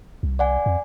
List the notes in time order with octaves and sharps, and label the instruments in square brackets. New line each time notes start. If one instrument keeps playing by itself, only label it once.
[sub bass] C2
[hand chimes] D5 F#5 G#5
[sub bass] F2